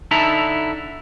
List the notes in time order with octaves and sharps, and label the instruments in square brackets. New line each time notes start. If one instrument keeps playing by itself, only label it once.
[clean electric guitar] D3 D#4 E4 E5 A5 A#5